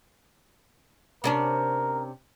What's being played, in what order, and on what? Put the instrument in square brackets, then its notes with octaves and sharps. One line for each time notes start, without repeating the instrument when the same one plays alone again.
[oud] C3 C#4 D4 [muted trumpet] A#4